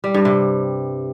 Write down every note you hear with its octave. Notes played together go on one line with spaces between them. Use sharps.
G3
G2
C3